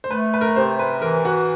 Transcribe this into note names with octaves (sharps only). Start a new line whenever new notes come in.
C5
A3 B4
B4
A#4
B4
C3 C5
B4
E3 A#4
F#4